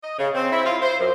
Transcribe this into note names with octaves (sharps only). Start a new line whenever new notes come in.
D#5
C#3
C4
E4
F4
C5
F#2